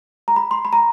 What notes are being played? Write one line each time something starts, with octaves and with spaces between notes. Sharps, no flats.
A#5
B5
C6
B5
A#5